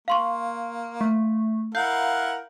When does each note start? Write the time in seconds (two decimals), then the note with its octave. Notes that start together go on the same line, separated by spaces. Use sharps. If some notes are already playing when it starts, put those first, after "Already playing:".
0.08 A#3 F5 C6 C#6
1.01 A3
1.75 E4 A#4 F5 F#5 G6